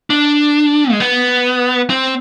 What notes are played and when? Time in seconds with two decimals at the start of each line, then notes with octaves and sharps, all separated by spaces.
0.10 D4
0.91 G#3
1.00 B3
1.90 C4